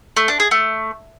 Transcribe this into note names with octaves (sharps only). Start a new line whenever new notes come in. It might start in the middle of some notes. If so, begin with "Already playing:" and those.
A3
D4
G#4
A3